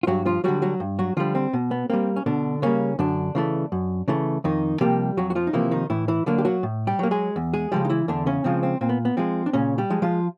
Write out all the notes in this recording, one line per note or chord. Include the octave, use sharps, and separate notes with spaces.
F4
G2 F#3 F#4
F3 F4
D3 F#3 G3 F#4
F#3 F#4
G2
F#3 F#4
D3 F3 G3 F4
C4
B2
B3
G3 A#3 C4
C#4
B2 D3 D4
C#3 G3 A#3 C#4
F#2 D3 D4
C#3 E3 A3
F#2
C#3 E3 A3
F2 D#3 D#4
C3 F3 G3 A#3 G4
F2 F#3 F#4
F#4
F3 F4
D#4
C3 E3 F3 A#3 E4
D#3 D#4
A2 E3 E4
E3 E4
D3 F#3 A#3 D4
G4
F#3 F#4
A2
G3 G4
F#3 A#3
G#3 G#4
E2
G#3 G#4
C#3 F3 G3 G#3 G4
D#4
E3 E4
E2 D3 D4
C#3 C#4
C#3 F3 G#3 C4
C4
A#2 C4
B3
B3
F3 G#3 C4
D4
A#2 C#3 C#4
G3 G4
F3 G#3
F3 F4